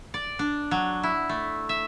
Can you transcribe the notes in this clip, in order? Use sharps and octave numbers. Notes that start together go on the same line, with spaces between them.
D5
D4
F#3
E4
A3
E5